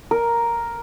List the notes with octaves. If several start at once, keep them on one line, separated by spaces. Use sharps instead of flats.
A#4